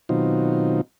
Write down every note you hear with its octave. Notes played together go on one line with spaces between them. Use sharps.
B2 D#3 F#3 C4 D#4 F4